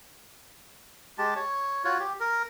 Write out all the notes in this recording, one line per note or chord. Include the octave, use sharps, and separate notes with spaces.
G#3 G4 A5
C#5
F4 F#4 C#5
G4
A#4